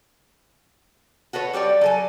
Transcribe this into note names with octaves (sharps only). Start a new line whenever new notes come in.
F#4 A4 B4 C#5
G3 G4 C#5 D5
F#3 A4 G#5